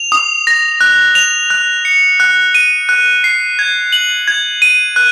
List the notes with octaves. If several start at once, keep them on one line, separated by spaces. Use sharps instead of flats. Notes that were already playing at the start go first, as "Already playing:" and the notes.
Already playing: F7
D#6
A#6
F#6
F7
F#6
C#7
F#6
D#7
F#6
C7
G#6
F#7
G#6
D#7
F#6